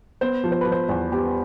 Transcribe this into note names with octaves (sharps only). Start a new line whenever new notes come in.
B3 C5
F3
C5
F3 B4
C5
E2
B3 G4